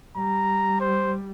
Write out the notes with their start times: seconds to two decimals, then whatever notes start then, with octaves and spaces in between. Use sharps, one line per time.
0.17 G3 A#5
0.80 C5